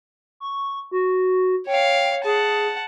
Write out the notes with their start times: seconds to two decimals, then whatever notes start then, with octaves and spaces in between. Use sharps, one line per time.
0.40 C#6
0.91 F#4
1.67 C#5 F5 G5
2.24 G#4 F#5 A5